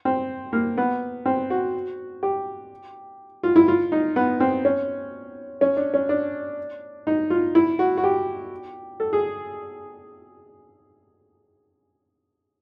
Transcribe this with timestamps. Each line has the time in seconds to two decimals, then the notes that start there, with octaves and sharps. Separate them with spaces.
0.05 C4
0.53 A#3
0.78 B3
1.26 C4
1.50 F#4
2.23 G4
3.43 F4
3.56 E4
3.68 F4
3.92 D#4
4.16 B3
4.40 C4
4.65 C#4
5.61 C#4
5.77 D4
5.94 C#4
6.09 D4
7.07 D#4
7.30 F4
7.55 E4
7.79 F#4
7.97 F#4
8.04 G4
9.00 A4
9.13 G#4